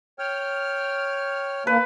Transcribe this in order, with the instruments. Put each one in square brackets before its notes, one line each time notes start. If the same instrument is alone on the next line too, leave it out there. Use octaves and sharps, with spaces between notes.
[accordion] C#5 G5 F6
[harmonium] A#3 [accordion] D4 [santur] B4